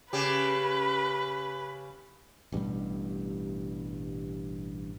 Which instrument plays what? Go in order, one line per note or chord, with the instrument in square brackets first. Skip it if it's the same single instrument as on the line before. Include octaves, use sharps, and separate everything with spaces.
[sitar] C#3 G4 [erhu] B4
[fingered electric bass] A1 G2 B2 G3